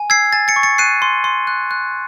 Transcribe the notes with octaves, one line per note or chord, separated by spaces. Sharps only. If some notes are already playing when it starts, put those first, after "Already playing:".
Already playing: G#5
E6 G#6 C7
G#5 A6
A6 C#7
C#6
A6 C#7
F#6 C7 D#7
C6
C6
F#6
F#6